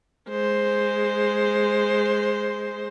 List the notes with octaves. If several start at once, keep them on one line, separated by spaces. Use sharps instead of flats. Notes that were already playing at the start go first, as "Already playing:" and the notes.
G#3 C5